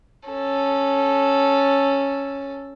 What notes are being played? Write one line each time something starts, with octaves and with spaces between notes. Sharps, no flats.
C#4 A4